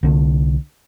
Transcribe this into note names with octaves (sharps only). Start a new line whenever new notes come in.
C2 D3